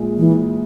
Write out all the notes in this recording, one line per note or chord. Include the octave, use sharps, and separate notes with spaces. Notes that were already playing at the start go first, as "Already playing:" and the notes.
Already playing: A#1 A#2 G#3
E3